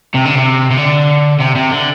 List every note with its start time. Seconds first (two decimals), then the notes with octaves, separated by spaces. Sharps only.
0.14 C3
0.25 D3
0.35 C3
0.71 C3
0.78 D3
1.40 C3
1.55 C3
1.71 D3